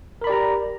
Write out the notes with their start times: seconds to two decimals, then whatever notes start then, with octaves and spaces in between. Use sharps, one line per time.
0.21 A#4
0.24 B5
0.27 D5
0.30 G4
0.32 A#5